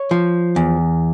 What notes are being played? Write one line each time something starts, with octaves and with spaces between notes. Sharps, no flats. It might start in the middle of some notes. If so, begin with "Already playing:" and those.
Already playing: C#5
F3
E2